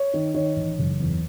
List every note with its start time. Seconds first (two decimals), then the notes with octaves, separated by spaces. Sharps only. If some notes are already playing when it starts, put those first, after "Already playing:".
Already playing: C#5
0.14 D#3
0.34 D#3 C#5
0.56 A1
0.79 F#1
1.00 E2